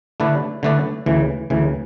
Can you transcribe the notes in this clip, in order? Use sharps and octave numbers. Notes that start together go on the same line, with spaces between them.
D3 A3 E4 B4 D5
D3 A3 E4 B4 D5
D2 C#3 E3
D2 C#3 E3